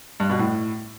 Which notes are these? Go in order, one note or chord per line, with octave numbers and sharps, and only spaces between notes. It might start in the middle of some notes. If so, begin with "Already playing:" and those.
G2
B2
A2